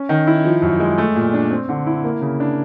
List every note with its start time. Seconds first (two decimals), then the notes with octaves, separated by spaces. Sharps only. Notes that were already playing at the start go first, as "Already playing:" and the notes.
Already playing: C#4
0.09 D#3
0.27 E4
0.45 F3
0.62 F#2
0.80 G#3
0.98 A3
1.16 A#2
1.33 D4
1.51 C4
1.69 D3
1.86 E4
2.04 A#3
2.21 C#3
2.40 D4